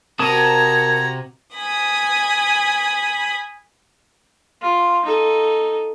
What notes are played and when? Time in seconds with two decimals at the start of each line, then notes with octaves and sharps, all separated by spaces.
0.19 C3 F#4 A#4 A5 A#5 D#6 G#6
1.56 G#5 B5 D#6
4.61 F4
5.05 D#4 A4